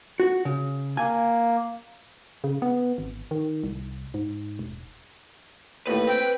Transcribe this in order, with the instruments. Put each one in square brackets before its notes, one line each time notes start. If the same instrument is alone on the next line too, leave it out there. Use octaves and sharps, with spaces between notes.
[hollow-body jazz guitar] F#4
C#3
[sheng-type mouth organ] A#3 [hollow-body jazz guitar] G#5
[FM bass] C#3
B3
G#1
D#3
C2
G#2
E1
[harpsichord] D#2 A2 [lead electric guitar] B4
[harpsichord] C4 [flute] G5